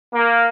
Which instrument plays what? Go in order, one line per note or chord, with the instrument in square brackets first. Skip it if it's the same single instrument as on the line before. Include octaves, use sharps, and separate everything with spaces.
[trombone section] A#3